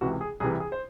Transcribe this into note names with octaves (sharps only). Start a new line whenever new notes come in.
C#2 C3 E3 F#4
G#4
C2 C3 E3 G#4
G#4
C5